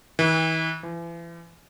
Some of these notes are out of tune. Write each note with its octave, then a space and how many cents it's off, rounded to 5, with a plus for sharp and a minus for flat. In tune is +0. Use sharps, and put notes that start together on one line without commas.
E3 -40
E3 +35